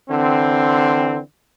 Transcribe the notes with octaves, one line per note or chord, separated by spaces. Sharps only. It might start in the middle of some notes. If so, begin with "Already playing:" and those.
D3 E3 C4